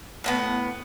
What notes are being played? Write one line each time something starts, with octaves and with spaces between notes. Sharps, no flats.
A2 A#3 B3